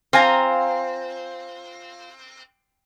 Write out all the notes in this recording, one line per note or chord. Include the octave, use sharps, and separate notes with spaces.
C4 F4 G#5 A#5